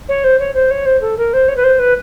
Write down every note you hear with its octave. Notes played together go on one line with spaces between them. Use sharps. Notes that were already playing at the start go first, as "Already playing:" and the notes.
C#5
C5
C#5
C5
C#5
C5
A4
A#4
C5
C#5
B4
C5
B4